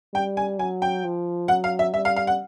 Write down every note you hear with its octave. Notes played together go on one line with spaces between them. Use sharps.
G3 G5
G#5
F#3 G#5
G5
F3
F#3 F#5
F5
E5
G3 E5
F5
F5
F#5